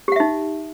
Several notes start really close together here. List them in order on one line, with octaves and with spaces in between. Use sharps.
G4 F#5 E5 D#4